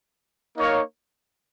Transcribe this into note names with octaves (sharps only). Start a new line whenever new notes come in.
A#3 D#4 A#4 C#5 F5